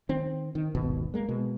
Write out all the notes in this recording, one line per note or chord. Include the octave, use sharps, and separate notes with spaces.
D#3 C4
D#3
D#1 G#1 B2
G#3 A#3
B2 G#3